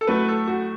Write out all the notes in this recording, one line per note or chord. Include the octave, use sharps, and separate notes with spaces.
A4
A2 F#3 A3 B4
A4
F#4